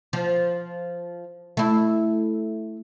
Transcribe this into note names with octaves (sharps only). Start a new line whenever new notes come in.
F3
A3 E4